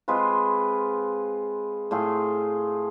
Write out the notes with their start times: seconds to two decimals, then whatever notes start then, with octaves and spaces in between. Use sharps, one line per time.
0.08 G#3 C4 F4 B4
1.91 A2 A3 F4 G#4